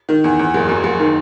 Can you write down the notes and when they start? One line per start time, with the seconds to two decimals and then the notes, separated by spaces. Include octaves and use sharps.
0.09 D#3
0.24 E2
0.39 E2
0.54 F#1
0.69 F#2
0.84 F#1
1.00 D#3